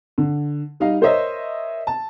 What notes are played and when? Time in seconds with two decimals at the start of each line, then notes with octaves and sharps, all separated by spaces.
0.18 D3
0.80 G3 D#4 D#5 F5
1.01 A#4 C5 C#5 D#5 E5
1.87 A5